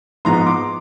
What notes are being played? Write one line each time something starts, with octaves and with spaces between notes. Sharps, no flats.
G#2 F3 G#3 B3 A#5 C6
C6 D6